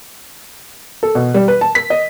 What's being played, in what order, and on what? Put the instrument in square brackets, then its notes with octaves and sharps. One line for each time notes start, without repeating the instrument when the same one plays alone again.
[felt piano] A4
B2
G3
B4
A5
B6
D#5